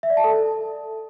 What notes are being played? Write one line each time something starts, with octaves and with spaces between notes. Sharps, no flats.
E5
D5
A5
A4